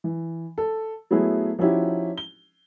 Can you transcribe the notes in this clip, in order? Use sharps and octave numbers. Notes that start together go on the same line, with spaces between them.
E3
A4
F#3 A3 B3 E4 G#4
F3 C#4 D#4 E4 F#4 G4
G7